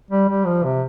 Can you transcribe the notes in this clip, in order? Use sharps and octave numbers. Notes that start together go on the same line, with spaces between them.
G3
G3
F3
C3